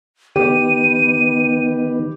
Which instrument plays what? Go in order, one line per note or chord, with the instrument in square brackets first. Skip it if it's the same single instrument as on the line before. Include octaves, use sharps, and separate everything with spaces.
[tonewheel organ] D#3 B3 [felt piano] G4 [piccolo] D#7